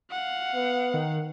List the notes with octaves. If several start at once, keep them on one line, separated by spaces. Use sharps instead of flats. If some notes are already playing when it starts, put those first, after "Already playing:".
F5 F#5
B3
D#3